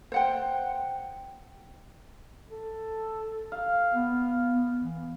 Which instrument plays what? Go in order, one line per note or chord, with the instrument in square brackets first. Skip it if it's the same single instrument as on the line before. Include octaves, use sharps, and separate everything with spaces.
[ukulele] C5 F#5 G5
[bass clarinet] A4
[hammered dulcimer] F5
[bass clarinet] B3
B3
E3